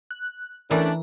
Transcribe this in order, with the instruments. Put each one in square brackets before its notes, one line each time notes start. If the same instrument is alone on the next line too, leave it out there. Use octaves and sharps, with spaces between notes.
[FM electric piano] F#6
[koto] E3 [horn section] A3 C#4 D4 [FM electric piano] A#4